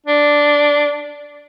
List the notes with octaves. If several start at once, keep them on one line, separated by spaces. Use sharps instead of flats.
D4